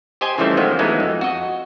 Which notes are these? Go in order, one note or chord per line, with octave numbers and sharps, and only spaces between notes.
G4 C5 D#5 G#5
C#3 E3 F3 G3 A3 C4
D#3 F3 F#3 G#3 B3 C4
E3 F#3 G#3 A3 B3 D#4
F2
F#4 D#5